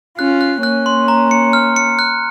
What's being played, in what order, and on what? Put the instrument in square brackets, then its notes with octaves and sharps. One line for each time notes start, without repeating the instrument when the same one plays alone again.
[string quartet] C#4 F4 [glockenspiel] F#6
[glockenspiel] F#6
[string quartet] A#3 C#4 [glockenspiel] F#6
[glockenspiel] C6
A#5
C#7
F6
C#7
F#6